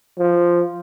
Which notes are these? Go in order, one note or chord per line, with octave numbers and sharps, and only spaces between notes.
F3